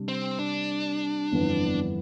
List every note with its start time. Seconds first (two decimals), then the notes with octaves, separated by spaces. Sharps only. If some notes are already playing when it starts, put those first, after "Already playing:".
Already playing: C3 G3 D4
0.08 C4
0.39 D4
1.32 G1 F2 E3 B3